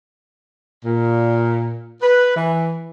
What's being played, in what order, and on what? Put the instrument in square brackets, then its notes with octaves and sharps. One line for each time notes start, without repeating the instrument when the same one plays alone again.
[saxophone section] A#2
B4
E3